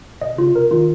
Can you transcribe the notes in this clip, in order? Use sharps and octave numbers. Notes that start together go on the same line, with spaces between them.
B2 D#5
C#3 F4
C3
A#4
D#3 F4